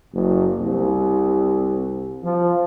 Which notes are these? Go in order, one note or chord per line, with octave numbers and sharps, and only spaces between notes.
F#1
C2
F3